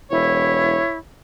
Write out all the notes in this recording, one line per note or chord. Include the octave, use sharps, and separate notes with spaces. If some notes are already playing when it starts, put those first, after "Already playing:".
E1 E4 C#5